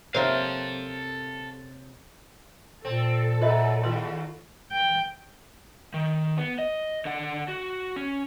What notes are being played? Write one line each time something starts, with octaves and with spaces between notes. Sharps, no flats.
C3 A#3 F4 A4 C5 C#5 F5
A#2 C4 A4
F#2 F4 B4 D#5 E5
D#2 F4 B4 C6
G5
D#3
B3
D#5
D3 F#5
F#4
C#4